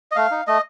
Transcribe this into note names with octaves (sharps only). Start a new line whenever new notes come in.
D#5
A3 F5
D#4
A3 D#5